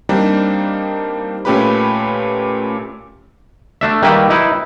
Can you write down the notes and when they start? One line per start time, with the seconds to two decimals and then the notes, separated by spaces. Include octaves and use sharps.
0.09 G3 A#3 C4 D4 D#4
1.45 A#2 A3 C#4 G4 B4 B5
3.81 A3 D4 E5
4.02 D#3 G3 A#3 B4 E5 G5
4.30 D#4 E4 B4